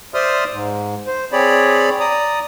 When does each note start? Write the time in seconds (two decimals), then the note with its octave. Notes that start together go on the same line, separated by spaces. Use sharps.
0.14 C5 D5 E5 C6 D#6 F6
0.52 G#2
1.07 C5
1.32 C4 G#4 C#5 D5 B5
2.00 D5 A#5 D#6